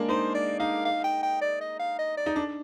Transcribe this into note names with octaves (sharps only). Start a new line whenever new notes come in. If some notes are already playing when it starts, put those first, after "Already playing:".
Already playing: G#3 A#3 D4
D#4 C5
D5
D#4 F5
F5
G5
G5
D5
D#5
F5
D#5
D5
D#4
D4